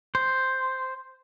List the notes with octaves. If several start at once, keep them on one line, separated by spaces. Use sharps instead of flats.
C5